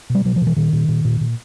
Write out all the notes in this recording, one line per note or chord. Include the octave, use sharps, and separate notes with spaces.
B2 G3
B2 F#3
F3
B2
E3
A#2 D#3
A#2
A#2
A#2
A#2